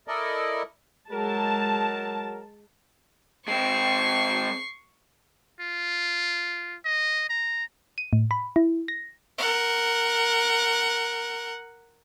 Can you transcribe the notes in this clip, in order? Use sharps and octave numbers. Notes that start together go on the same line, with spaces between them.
E4 A4 A#4 D5 D#5
F#3 G#3 A#4 A5
G#3 C4 C#6 C7
F4
D#5
A#5
D#7
A2
B5
E4
A#6
A#4 F#5